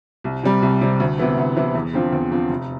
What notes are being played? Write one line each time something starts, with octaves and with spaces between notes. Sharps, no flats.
C2
C3 G3
C2
C3 G3
D2
C3 E3 B3 E4
D2
C3 E3 B3 E4
E2
D3 F3 C4 F4
E2
D3 F3 C4 F4
F1